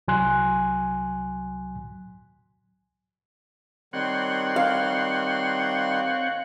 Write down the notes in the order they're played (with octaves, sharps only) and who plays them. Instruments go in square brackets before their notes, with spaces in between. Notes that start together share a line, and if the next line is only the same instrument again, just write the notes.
[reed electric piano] C2 F#3 G#5 C6 F#6
[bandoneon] D#3 G3 C6 [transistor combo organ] C4 C#5 F#5
[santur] F5